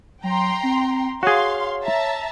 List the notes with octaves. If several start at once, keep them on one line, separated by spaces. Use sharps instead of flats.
F#3 G5 A#5 C6
C4
F#4 G#4 C#5 F5 C6
E5 A5 A#5